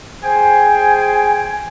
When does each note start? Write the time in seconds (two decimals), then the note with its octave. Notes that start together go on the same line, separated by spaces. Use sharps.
0.23 G#4 C5 G5 G#5